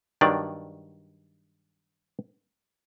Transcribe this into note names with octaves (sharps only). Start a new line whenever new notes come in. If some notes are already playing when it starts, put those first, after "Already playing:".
G2 D#3 F#3 D4 D5